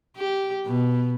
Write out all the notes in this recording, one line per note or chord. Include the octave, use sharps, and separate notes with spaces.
G4
B2